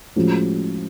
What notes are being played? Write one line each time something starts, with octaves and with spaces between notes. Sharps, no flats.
A2 F3 G#3 C#4 F#4